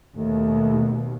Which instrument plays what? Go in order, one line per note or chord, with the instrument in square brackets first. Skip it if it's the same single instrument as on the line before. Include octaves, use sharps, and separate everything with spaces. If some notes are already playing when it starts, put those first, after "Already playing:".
[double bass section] D#2 B2 [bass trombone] A3